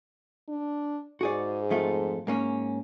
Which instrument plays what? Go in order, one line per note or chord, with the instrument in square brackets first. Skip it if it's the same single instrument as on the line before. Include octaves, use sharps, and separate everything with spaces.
[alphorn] D4
[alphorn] G#2 [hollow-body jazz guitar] F#4 G#4 D5
[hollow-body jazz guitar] F2 A3 F4
G#2 A#3 C#4